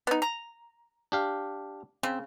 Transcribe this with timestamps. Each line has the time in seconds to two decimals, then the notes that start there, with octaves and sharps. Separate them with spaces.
0.07 B3 D#4
0.22 A#5
1.12 D4 G4 F5
2.03 C#3 C4